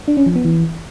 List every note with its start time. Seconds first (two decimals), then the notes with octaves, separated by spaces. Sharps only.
0.08 D4
0.17 C#4
0.26 F3
0.36 B3
0.45 E3